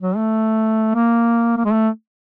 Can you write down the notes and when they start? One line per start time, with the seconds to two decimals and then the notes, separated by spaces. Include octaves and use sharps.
0.01 F#3
0.17 A3
0.95 A#3
1.57 A#3
1.65 G#3
1.72 A3